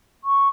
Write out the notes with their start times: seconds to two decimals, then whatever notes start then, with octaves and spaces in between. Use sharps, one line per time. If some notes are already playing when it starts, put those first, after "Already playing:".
0.24 C#6